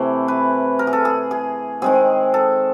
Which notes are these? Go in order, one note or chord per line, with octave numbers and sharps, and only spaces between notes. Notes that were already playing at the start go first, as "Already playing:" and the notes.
Already playing: C3 E3 A3 C5
B4
A#4
G#4
A4
G#4
G#4
D#3 G#3 C4 G#4
A4